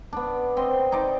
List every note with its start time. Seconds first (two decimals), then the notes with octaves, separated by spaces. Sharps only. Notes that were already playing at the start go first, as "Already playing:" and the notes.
0.13 B3 D4
0.57 C4 C5 D#5 C6
0.92 D#4 C5 D5